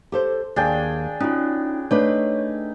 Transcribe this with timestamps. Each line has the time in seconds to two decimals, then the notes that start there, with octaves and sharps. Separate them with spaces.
0.12 G4 A4 C5
0.56 D#2 D4 G#4 G5
1.21 C#4 D#4 F4 F#4
1.91 A3 D4 D#4 B4 C#5